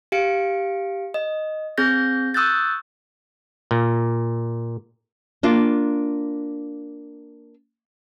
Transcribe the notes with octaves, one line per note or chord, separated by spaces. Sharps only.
G4 F5 C#7 D7
D#5
C4 G#4 G6 A#6
C#6 D#6 E6 F#6 G6 A6
A#2
A#3 D4 F4